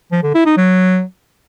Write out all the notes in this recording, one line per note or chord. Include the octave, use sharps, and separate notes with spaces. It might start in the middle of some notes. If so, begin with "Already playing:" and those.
F3
D3
E4
D#4
F#3